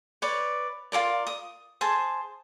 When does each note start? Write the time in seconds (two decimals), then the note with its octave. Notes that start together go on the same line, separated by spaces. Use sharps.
0.22 B4 C#5 D5
0.92 F4 A4 A#4 D5
1.27 D#6
1.81 G#4 C5 A5